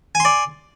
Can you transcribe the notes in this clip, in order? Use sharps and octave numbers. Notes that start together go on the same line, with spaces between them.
D5 G#5 C6